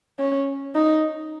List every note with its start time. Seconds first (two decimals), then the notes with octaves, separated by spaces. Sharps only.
0.19 C#4
0.75 D#4